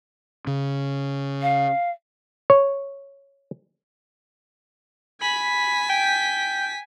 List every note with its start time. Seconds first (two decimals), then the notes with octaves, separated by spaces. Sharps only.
0.47 C#3
1.42 F5
2.50 C#5
5.21 G#5 B5 B6
5.89 G5